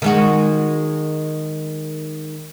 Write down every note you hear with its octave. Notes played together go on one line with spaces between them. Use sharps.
D#3 G#3 F#4